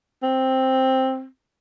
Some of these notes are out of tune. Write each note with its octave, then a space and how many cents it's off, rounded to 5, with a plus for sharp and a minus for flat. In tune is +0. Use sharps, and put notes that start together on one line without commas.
C4 +5